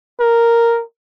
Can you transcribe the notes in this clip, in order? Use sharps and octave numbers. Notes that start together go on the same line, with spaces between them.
A#4